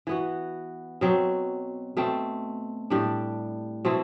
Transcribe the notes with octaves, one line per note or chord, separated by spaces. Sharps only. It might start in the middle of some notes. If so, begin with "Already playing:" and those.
E3 B3 F#4
B2 F#3 C4
B2 A3 C4
A2 G3 D4
B2 A3 C4 E4